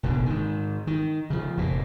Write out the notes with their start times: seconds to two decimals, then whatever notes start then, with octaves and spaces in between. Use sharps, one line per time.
0.03 F1 A#1 B2 D3
0.26 G#2 D#3
0.87 D#3
1.30 C#3 F3
1.57 F1 A#2